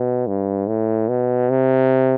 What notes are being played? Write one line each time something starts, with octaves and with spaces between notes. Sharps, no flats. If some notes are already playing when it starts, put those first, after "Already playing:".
Already playing: B2
G2
A2
B2
C3